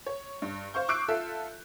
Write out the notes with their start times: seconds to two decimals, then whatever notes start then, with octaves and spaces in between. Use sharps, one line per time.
0.06 C#5
0.42 G2
0.74 C5 F5 C#6 G6
0.88 C#6 D6 E6 F#6 C7 D7
1.08 F4 A4 E5